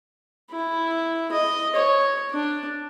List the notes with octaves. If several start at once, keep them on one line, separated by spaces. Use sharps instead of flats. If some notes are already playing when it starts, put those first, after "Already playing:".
E4
D#5
C#5
D4